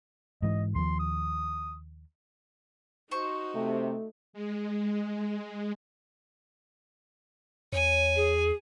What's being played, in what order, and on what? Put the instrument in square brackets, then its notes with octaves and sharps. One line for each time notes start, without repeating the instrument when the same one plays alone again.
[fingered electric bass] G#2 E3 [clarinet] D#5
[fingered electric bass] D#2 F3 [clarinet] C6
[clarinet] D#6
[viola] D#4 F#4 [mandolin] C5 C#6
[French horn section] C3 [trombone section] A3
[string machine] G#3
[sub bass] E2 [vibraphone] C#5 [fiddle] G#5
[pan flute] G#4